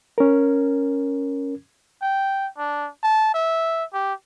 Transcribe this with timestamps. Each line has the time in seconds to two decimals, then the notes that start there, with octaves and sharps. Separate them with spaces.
0.18 C#4 A#4
2.02 G5
2.58 D4
3.03 A5
3.34 E5
3.93 G4